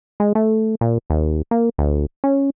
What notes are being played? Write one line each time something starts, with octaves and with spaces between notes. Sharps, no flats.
G#3
A3
A#2
D#2
A#3
D2
C#4